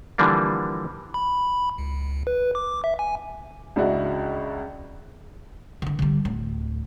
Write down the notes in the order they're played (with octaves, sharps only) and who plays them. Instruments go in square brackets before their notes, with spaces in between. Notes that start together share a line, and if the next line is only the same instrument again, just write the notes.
[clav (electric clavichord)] D3 E3 F3 G3 A#3 D4
[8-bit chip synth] B5
C#2
B4
D6
E5
G#5
[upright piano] C#2 C#3 D4 E4 F#4
[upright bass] D3 E3
D3 G3
D1